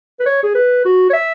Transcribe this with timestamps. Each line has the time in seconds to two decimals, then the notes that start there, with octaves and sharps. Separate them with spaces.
0.20 B4
0.26 C#5
0.43 G#4
0.55 B4
0.85 F#4
1.10 C#5
1.13 E5